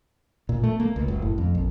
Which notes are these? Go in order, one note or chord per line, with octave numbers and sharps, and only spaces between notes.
A#2
A3
A#3
C#2
F#1
A2
F2
A#1